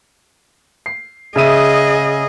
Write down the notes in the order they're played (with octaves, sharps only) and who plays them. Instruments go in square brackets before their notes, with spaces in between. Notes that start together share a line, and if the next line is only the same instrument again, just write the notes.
[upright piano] C7
[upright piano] C#3 E5 D#7 [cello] G#4 D#5